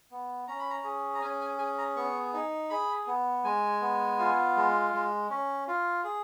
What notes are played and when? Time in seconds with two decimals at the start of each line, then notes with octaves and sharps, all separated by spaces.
0.11 B3
0.47 C#4 A#5
0.59 B5
0.70 A#5
0.84 G#4
1.15 A#5
1.21 C#4 G#5
1.41 G#5
1.58 G#4 G#5
1.78 A#5
1.96 B3 C#6
2.33 D#4
2.70 G#4 B5
3.07 B3
3.44 G#3 G#5
3.81 B3
4.19 F4
4.56 G#3
4.93 G#3
5.30 C#4
5.68 F4
6.04 G#4